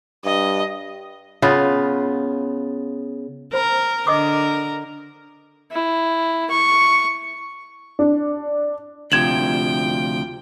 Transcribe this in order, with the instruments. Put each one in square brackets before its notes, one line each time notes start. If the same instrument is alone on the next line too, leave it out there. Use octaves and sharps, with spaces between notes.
[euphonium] G2 [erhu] D#5
[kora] C#3 B3 F4
[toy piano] F4 C5 [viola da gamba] A#4
[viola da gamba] D3 A#4 [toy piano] D#5 D6 D#6
[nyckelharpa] E4
C#6
[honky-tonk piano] D4
[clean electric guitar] D2 C3 F3 [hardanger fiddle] G5 [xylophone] G#6 E7 F#7